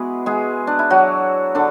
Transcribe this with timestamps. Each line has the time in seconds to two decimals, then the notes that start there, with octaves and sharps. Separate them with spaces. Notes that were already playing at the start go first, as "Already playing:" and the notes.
Already playing: G#3 B3 E4 F#4 G#4 B4
0.26 G#3 G#4
0.67 D4
0.79 E4
0.90 F#3 F#4
1.55 D3 D4